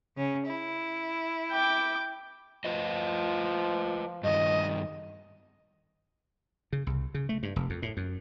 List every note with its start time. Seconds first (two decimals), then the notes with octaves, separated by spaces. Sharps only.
0.16 C#3 C#4
0.45 E4
1.52 G5 D6
2.65 F3 F4 B4 D#5
4.23 G2 D#3 D#5
6.73 C#3
6.87 C2
7.14 C#3
7.29 A3
7.43 G2
7.56 F1
7.70 F2
7.82 A2
7.97 F#2